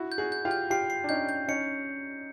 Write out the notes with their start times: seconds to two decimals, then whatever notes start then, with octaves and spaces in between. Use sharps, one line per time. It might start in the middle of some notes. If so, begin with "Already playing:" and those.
Already playing: E4 F#4
0.12 G6
0.18 F#4 G#4
0.32 G6
0.45 F4 G4
0.51 G6
0.70 F4 G4 C7
0.90 C7
1.04 D4
1.09 C#4 D#4 G6
1.29 G6
1.48 C#4 D#4 C#7